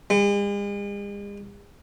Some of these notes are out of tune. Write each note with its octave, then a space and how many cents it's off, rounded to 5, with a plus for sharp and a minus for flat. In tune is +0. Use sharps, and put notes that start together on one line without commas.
G#3 -45